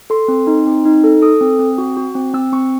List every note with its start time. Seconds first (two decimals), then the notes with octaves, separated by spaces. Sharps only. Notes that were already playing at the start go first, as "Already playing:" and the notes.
0.10 A4 C6
0.28 C4
0.47 D#4
0.67 C4
0.85 D#4
1.04 A4
1.22 A4 D#6
1.41 C4
1.59 C4
1.78 F#4
1.97 F#4
2.15 C4
2.34 C4 E6
2.53 C4 C#6